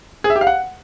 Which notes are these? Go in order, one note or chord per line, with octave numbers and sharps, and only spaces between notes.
G#4
E5
G4
F5
F#5